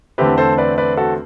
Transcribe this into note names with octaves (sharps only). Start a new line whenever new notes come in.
E2 D3 A3 C4 G4 B4
A4 C5
B4 D5
B4 D5
F#4 A4